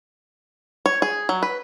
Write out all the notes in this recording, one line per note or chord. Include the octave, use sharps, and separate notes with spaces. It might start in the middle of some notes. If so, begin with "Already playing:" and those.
C#5
G#4
F#3
B4